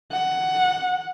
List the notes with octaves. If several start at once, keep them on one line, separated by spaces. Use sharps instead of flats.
F#5